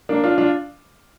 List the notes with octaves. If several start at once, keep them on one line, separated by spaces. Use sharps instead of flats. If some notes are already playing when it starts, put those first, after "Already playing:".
A#3 D4
D4 F4
D4 F4